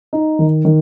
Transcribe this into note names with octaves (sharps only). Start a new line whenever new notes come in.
D#4
D#3
D#3